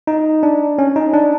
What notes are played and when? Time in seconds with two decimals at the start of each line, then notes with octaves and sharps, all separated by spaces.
0.07 D#4
0.43 D4
0.79 C#4
0.96 D#4
1.13 D4